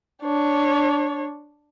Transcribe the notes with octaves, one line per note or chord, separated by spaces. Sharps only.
D4 C#5